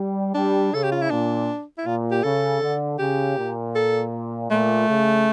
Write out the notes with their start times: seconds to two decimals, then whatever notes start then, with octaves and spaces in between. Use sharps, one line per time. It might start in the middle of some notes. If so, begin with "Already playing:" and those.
Already playing: G3
0.35 G3 D4
0.73 C#3 A4
0.83 G4
0.92 F4
1.02 E4
1.11 A#2 D4
1.78 E4
1.86 A#2 F4
2.11 G4
2.23 C#3 A4
2.62 D3
2.99 C#3 G4
3.38 A#2
3.75 A4
4.51 A#2 A3
4.88 C#3